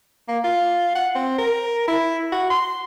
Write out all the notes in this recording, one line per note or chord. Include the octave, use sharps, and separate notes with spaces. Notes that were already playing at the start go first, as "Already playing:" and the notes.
A#3
F4
F#5
C4
A#4
E4
F#4
C6